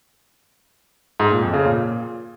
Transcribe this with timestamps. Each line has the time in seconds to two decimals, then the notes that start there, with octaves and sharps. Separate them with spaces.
1.20 G#2
1.31 A#2
1.42 F2
1.53 C#3
1.65 A#2